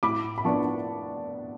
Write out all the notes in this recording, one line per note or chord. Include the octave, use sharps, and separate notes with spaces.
A2 B5 D6
B5
F3 B3 D4 A5 C#6